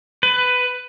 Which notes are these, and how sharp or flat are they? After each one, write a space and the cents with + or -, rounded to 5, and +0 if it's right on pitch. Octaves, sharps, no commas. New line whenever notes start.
B4 +15